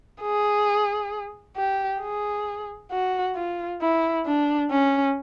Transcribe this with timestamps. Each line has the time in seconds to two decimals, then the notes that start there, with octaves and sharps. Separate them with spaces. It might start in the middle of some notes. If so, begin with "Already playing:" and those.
0.22 G#4
1.56 G4
2.01 G#4
2.92 F#4
3.36 F4
3.81 E4
4.26 D4
4.71 C#4